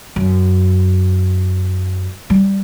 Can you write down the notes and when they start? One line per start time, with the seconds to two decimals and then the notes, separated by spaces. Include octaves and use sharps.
0.16 F#2
2.30 G3